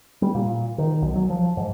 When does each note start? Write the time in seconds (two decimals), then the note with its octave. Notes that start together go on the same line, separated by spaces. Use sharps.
0.22 G3
0.35 A#2
0.78 D#3
1.02 B1
1.16 F#3
1.30 F3
1.57 G#2